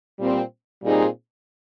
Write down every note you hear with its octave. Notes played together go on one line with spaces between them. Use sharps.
A#2 G3 C4
A#2 G3 C4 D#4 G#4